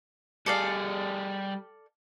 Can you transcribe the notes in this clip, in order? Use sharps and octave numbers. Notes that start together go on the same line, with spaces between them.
G3 G#4 A4 D5 F5